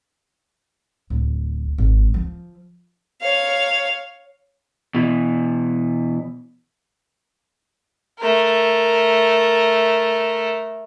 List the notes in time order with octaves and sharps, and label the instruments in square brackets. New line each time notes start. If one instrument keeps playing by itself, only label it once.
[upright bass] D1
G#1
F3
[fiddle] C#5 F5
[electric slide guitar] B2 E3
[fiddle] A3 A#4